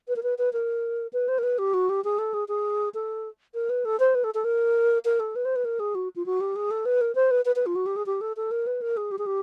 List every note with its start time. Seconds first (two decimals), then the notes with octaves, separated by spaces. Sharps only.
0.08 B4
0.16 A#4
0.23 B4
0.38 B4
0.53 A#4
1.13 B4
1.28 C5
1.39 A#4
1.43 B4
1.58 G4
1.74 F#4
1.89 G4
2.04 G#4
2.18 A4
2.34 G#4
2.48 G#4
2.94 A4
3.54 A#4
3.69 B4
3.85 A4
4.00 C5
4.15 B4
4.24 A4
4.34 A4
4.44 A#4
5.05 A#4
5.20 A4
5.36 B4
5.45 C5
5.56 B4
5.65 A#4
5.80 G#4
5.95 F#4
6.16 F4
6.26 F#4
6.41 G4
6.56 G#4
6.71 A4
6.85 B4
7.01 A#4
7.15 C5
7.31 B4
7.45 B4
7.56 B4
7.66 F4
7.76 F#4
7.86 G4
7.96 G#4
8.06 G4
8.21 A4
8.37 A4
8.51 A#4
8.67 B4
8.81 A#4
8.97 G#4
9.11 G4
9.18 G#4
9.26 G4